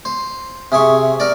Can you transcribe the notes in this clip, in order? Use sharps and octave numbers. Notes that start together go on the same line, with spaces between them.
C5
C3 G#4 E5 C#6
A#4 D5